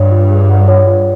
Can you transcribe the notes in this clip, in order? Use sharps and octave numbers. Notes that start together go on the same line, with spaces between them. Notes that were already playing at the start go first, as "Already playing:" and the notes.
Already playing: G2 C#5
F4
G#4
F#5
C#5
F4